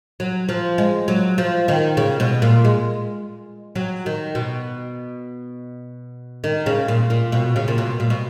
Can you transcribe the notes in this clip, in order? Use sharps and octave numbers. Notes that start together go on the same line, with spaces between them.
F#3
F3
G#3
F#3
F3
D#3
C#3
B2
A#2
G#3
F#3
D#3
B2
D#3
C#3
A#2
A#2
B2
C#3
A#2
B2
A#2
B2